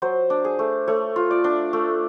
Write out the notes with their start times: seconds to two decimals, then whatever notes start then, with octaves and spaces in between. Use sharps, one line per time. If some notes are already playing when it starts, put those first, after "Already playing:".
0.02 F#3 C5
0.30 D4
0.44 G#4
0.59 A3
0.87 A3 C#5
1.16 F4
1.31 D5
1.44 D4
1.73 A3